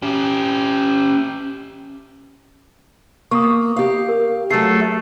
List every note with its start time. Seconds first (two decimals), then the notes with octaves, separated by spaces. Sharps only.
0.02 C#4 G4
3.31 A#3 C#6 D#6
3.76 G4 F5
4.09 A#4
4.50 F#3 A3 G#4 C7